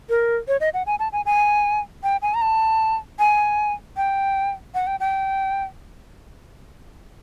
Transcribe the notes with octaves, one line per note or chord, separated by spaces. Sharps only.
A#4
C#5
D#5
F#5
G#5
A5
G#5
G#5
G5
G#5
A#5
A5
G#5
G5
F#5
G5
G5